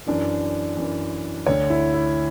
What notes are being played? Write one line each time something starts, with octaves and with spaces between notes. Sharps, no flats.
F#2 E3 D4
F#2 E3
D2 D3 C#5
E4
E4